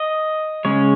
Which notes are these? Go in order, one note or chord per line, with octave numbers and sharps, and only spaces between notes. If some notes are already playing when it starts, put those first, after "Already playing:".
Already playing: D#5
C#3 G#3 C#4 C#5